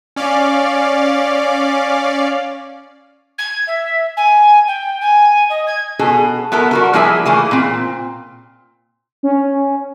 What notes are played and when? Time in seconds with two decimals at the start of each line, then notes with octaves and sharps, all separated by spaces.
0.16 C#4 D5 F5
3.38 G#6
3.67 E5
4.17 G#5
4.67 G5
5.01 G#5
5.50 D#5
5.67 G#6
5.99 B2 G#4 A4
6.52 B3 E4 A4 A#4
6.71 G3 F#4 A#4
6.93 F3 G3 A#3 E4 G#4 E5
7.25 E3 A3 A#3 G#4
7.51 A#2 C4
9.23 C#4